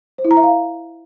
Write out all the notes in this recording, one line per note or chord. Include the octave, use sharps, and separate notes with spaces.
C5
E4
A#5
E5
F5